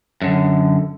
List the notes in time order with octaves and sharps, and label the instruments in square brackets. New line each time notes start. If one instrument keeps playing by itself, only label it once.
[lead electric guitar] F#2 D3